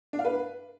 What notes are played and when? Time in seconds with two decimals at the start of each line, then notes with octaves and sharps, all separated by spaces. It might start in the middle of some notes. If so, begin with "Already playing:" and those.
0.13 D4
0.19 F5
0.25 B4